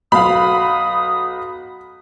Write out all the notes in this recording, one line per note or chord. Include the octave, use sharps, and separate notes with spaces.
B1 F5 B5 D#6